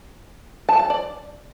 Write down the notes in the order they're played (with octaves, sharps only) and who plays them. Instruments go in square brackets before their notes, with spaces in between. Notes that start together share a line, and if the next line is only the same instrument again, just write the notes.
[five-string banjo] A5
A5
D5